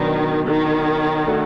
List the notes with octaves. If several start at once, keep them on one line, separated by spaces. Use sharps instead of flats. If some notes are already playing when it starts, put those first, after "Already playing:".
Already playing: B2 D#3 F#3 B3 D4
D#3
A3 D4 F#4 A4